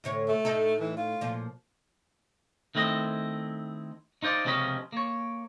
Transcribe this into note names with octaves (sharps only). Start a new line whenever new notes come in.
D2 A2 C#5
A3
A2 D#4 A4
E3
F4
A#2 F3
D#3 A3 C4 E4 D#5
D#4 F4 C5 D5
C#2 C3 F3 C#4 D#5 B5
A#3 C#5